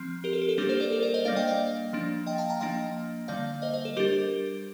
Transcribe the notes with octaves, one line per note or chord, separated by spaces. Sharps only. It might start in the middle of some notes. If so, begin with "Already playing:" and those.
Already playing: F3 C4
G4 A#4
A4
G4
A4
G3 A#3 D4 G4 A#4
A4 C5
A#4 D5
A4 C5
A#4 D5
C5 D#5
G3 A#3 D4 D5 F5
D#5 G5
D5 F5
F3 A#3 D4
D#5 G5
F5 A5
G5 A#5
F3 A#3 D4 D#5 G5
D3 G3 A#3 D5 F5
C5 D#5
C5 D#5
A4
G3 D4 G4 A#4